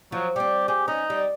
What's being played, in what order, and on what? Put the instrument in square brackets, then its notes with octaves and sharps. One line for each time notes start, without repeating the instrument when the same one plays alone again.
[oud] F3 [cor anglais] F#3
[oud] G3 C4 [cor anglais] G4
[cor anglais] G4 [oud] G#4
[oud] C#4 [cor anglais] D#4
[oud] G3